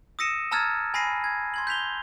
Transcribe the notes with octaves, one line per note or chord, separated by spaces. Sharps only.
D#6 E6 A#6 C#7 D#7 E7
A5 A#5 E6 F6 G#6 A6
G#5 B5 A#6 C7 D#7
G#6
C6 G#6 F#7
G6 B6 F7 G7